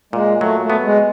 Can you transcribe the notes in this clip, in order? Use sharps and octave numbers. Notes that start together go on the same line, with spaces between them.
A#2 G#3
F#3 A3
A3
B3
G#3